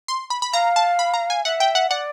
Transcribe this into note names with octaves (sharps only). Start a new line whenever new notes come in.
C6
B5
B5
F5 A#5
A5
B5
A#5
G#5
E5 F#5
G5
F#5
D5 F#5